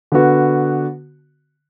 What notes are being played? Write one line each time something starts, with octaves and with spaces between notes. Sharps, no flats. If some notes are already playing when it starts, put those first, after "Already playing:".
D3 B3 F#4